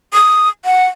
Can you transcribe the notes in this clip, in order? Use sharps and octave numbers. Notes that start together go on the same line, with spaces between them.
D#6
F#5